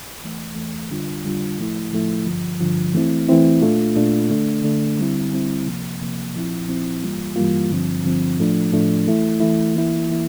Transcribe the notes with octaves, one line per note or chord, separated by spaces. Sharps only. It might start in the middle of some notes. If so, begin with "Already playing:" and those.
E2 E3 A3
E2 E3 A3
F2 D3 G3 D4 F4
F2 D3 G3 D4 F4
A2 F3 A3 E4
A2 F3 A3 E4
G2 D3 F3
G2 D3 F3
E3 A3 C4 E4
E3 A3 C4 E4
A#2 A3 D4 F4
A#2 A3 D4 F4
D3 A3 D4
D3 A3 D4
D3 G3 C4 E4
D3 G3 C4 E4
C3 F3 A#3
C3 F3 A#3
A#2 F3 C4 E4
A#2 F3 C4 E4
G2 E3 G3 A#3 F4
G2 E3 G3 A#3 F4
G2 D3 F3 C4
G2 D3 F3 C4
A2 F3 A3 D4
A2 F3 A3 D4
E3 A3 E4
E3 A3 E4
E3 A#3 E4
E3 A#3 E4